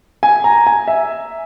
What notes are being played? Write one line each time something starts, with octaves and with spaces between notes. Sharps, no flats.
G#5
A#5
G#5
E5